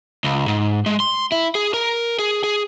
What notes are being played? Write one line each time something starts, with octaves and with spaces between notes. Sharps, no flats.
C#2
G#2
G#3
C6
E4
G#4
A#4
G#4
G#4